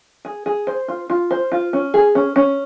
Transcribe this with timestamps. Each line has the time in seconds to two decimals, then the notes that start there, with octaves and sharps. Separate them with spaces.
0.25 G#4
0.46 G#4
0.67 C5
0.88 F4
1.10 F4
1.31 C5
1.52 F4
1.73 C#4
1.94 G#4
2.15 C#4
2.36 C#4